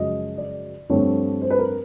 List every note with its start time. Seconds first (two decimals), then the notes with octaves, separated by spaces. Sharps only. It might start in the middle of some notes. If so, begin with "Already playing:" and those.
Already playing: F#2 C#3 F3 G#3 D#5
0.38 D5
0.90 G2 D3 F3 A3 C4 C#5
1.42 C5
1.50 B4
1.59 A#4